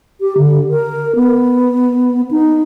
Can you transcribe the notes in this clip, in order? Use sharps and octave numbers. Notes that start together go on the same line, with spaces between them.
G4
D3
A#4
B3
D#4